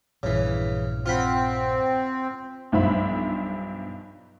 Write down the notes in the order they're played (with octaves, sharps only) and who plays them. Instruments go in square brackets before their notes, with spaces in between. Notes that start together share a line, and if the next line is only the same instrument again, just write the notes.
[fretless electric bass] A#1 G2 [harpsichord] C#3 E3
[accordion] C4 [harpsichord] F4 F#5 B5
[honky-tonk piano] B1 G2 F3 C5 E5 B5